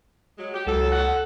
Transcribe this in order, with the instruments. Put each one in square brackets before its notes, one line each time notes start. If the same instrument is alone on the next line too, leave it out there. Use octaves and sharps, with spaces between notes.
[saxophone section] F#3 G#3
G4
[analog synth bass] C#2 [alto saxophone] F#3 [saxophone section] A4
[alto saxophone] F#5